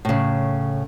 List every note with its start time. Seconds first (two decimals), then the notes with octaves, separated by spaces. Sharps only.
0.05 A2 C#3